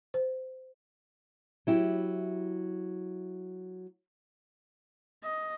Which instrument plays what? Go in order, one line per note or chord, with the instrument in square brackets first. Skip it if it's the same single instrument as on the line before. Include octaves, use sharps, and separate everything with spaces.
[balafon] C5
[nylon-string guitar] F#3 E4 G4
[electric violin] D#5